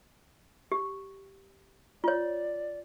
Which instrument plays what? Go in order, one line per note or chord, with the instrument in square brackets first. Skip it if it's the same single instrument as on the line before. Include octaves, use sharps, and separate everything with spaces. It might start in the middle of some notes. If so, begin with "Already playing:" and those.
[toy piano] G4
[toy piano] F4 C#5 [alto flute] D5